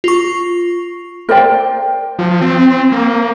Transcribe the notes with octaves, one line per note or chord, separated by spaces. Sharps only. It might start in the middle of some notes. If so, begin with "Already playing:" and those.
F4 C#6
A#4 C5 D5 G5
F3
C4
A#3